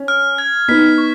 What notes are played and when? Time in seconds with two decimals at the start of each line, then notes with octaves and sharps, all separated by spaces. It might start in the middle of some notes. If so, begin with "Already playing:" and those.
Already playing: C#4
0.08 F6
0.38 G#6
0.68 B3 D#4 B6
0.98 C#6